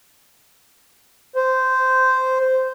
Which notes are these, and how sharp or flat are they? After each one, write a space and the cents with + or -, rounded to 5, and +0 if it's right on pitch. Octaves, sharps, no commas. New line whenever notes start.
C5 -10